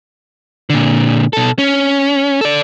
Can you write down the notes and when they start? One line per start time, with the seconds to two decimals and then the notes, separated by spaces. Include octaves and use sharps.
0.70 A#2 D3
1.33 B2 A4
1.59 C#4
2.41 A4 D5